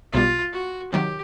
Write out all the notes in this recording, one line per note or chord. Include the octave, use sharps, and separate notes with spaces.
B1 B2 G3 F4
F#4
C3 D#3 F#3 G4